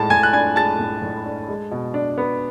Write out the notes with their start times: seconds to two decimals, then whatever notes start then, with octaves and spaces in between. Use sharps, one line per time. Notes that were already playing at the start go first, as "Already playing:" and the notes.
Already playing: A2 G#3 A5 A6
0.10 A2 G#5 G#6
0.23 F#6
0.33 D4 G#5 G#6
0.56 G#3 A5 A6
0.79 A2
1.02 A2
1.26 D4
1.48 G#3
1.71 B2
1.94 D4
2.18 B3